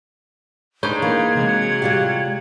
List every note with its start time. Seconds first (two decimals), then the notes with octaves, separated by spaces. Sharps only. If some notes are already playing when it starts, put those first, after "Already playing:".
0.83 G#2 D4 B4 C#5 G6
1.02 E3 A#3 G#6
1.35 G#2 C3 G#3
1.47 F#3
1.82 G3 F4 G4